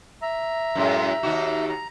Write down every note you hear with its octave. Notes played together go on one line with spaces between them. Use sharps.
E5 A#5
F#2 A2 G#3
D#2 D#4 F#4
A#5